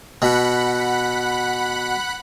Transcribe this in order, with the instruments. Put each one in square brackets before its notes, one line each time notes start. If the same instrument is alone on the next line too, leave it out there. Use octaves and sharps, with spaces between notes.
[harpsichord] B2 [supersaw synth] F#5 B5 F#6